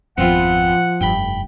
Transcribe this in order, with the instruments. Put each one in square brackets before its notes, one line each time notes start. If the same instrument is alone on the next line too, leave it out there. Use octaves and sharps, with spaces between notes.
[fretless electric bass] G#1 F2 [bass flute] F3 [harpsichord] B3 C4 F4 [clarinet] F#5
[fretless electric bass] F1 G2 [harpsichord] G5 B5